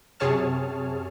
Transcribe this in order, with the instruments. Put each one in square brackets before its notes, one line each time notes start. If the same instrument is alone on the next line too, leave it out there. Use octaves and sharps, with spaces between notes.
[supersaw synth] F#2 C3 G#4 C#5 A5 F6